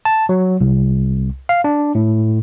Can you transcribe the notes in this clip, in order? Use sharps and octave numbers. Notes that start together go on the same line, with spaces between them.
A5
F#3
C2
F5
D4
A2